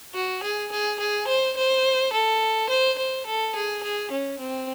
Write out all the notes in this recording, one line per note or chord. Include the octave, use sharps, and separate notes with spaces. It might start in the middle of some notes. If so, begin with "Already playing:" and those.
F#4
G#4
G#4
G#4
C5
C5
A4
C5
C5
A4
G#4
G#4
C#4
C4